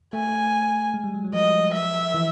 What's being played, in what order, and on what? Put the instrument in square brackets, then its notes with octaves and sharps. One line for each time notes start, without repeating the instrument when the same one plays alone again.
[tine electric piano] A3 [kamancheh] G#5
[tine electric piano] G#3
G3
F#3
F#3
[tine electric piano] F3 [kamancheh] D#5
[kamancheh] E5
[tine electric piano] E3